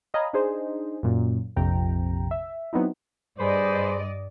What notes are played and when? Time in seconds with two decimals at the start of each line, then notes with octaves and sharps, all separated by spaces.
0.14 C#5 D#5 F5 G#5 A#5 B5
0.33 D4 D#4 G#4 C5 D#5
1.03 F#2 A#2
1.56 A#1 F2 C3 G5 A#5
2.31 E5
2.73 F#3 B3 C4 D#4 E4
3.38 G2 G#4 B4 C5 D5 D#5